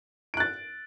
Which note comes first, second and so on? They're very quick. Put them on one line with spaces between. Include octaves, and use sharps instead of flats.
D7 F#6 A6